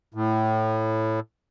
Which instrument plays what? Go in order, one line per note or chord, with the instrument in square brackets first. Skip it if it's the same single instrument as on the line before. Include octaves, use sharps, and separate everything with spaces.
[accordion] A2